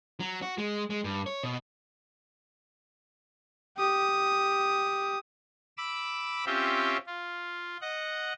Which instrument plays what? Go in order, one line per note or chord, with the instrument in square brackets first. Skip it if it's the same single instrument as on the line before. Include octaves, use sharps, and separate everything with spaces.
[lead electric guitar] F#3
F#4
G#3
G#3
G2
C#5
B2
[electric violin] G4 D#6
[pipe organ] B5 D6 E6
C4 C#4 F4 G4 E5
F4
D#5 F#5